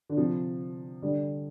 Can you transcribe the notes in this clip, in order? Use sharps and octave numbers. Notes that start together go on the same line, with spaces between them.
D3
C3 F3
D3 G3